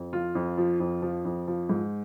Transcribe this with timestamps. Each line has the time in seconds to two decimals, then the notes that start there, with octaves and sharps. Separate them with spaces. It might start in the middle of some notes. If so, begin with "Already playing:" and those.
Already playing: F2
0.13 F3 F4
0.35 F2
0.58 F3
0.80 F2
1.02 F3
1.25 F2
1.48 F3
1.69 G#2